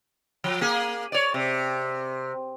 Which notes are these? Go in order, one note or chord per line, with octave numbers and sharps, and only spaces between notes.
F3
A#3 G#4
C#5 D5
C3